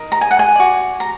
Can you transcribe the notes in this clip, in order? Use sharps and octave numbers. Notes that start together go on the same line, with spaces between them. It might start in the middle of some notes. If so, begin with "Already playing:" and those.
Already playing: D#4 A#4
A#5
G#5
F#5
G#5
F#4 D5
A#5